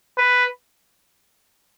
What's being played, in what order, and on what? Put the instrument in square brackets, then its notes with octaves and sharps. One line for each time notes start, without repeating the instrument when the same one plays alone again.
[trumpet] B4